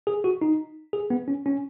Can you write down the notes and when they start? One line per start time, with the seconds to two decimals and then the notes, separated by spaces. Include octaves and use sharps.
0.07 G#4
0.24 F#4
0.42 D#4
0.93 G#4
1.10 B3
1.28 C#4
1.46 C#4